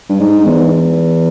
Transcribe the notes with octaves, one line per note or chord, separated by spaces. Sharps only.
G2
G#2
E2